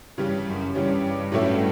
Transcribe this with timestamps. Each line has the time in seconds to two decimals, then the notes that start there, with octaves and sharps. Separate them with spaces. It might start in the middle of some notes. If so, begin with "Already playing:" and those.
0.17 G2 C#3 E3 G3 C#4
0.47 F#2
0.74 G2 C#3 E3 G3 C#4
1.32 A2 F#3 A3 C#4 E4